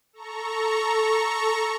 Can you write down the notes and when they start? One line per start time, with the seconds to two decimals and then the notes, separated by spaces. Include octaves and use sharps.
0.13 A4 A#5 C#6